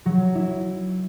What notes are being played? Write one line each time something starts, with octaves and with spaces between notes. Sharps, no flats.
F#3
E4